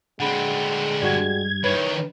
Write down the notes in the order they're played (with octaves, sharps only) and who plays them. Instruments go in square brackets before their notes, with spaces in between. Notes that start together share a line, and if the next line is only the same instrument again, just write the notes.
[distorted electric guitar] D3 C4 [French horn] G#3 [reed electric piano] F#5 B5
[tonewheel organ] G2 G#6 [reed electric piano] F#4 G4 D5
[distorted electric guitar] D#3 E3 [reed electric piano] B4 [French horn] C#5